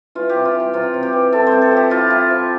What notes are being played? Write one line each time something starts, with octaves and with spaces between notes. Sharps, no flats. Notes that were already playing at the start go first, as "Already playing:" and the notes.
E3 F4
G4
C3
F4
E3
G4
C3 F4
C3
G4
E3
C4 A4
C5
C4
A4
F3 G4
E4 F4
E4
F3